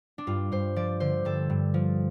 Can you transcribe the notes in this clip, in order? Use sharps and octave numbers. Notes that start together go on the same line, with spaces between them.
D4
G2 F4
G2 C5
F3 D5
D3 C5
G2 A4
G2
F3